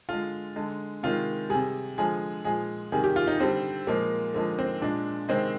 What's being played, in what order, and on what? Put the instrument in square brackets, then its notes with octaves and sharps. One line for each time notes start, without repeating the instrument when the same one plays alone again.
[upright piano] D3 G#3 F4
D3 G#3
C3 D#3 G#3 F4
C3 G3 G#4
D3 F3 G#3 G#4
A#2 F3 G#3 G#4
C3 D#3 G3 G#4
G4
F4
D#4
D3 G3 C4
A#2 F3 G#3 A#3
D3 F3 G#3 A#3
C4
A#2 G#3 D4
C3 D#3 G#3 C4